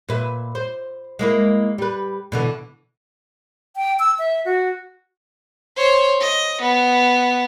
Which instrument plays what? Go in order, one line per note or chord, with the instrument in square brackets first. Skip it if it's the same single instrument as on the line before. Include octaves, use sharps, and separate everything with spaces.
[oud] A#2 B4 E5
C5
G#3 A#3 E4
G3 B4
B2 D3 E3
[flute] G5
E6
E5
F#4
[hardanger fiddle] C5 C#5
D#5
B3